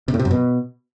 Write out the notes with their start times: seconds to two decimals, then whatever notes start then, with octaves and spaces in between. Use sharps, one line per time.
0.08 C3
0.14 A2
0.19 C3
0.25 F#2
0.31 B2